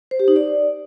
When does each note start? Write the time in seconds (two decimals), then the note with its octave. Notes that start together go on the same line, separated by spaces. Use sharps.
0.11 C5
0.20 G4
0.28 D#4
0.36 D5